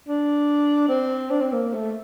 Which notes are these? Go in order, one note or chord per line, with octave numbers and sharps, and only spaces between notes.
D4
C4
D4
C4
A#3
A3